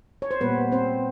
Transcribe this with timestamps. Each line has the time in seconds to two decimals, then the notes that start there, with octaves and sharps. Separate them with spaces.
0.22 C#5
0.31 C5
0.41 A#2 G3 A#3 B3 B4
0.72 C4 C5